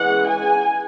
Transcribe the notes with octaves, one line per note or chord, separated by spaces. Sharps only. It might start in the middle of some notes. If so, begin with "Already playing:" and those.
Already playing: E3 G#3 C#4 F#5
G#5